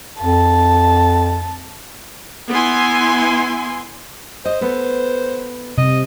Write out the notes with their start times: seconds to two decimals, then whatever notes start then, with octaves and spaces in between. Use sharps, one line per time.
0.20 F2 A5
2.49 B3 E4 G#5 C6
4.45 C5 D#5
4.61 B3 A4 B4
5.78 C3 D#5